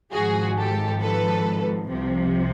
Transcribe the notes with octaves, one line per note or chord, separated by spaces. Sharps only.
G#1 G#2 F3 F#4 G#4
G4 A4
A4 B4
C2 C3 F3